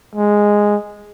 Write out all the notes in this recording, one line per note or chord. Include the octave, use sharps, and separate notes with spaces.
G#3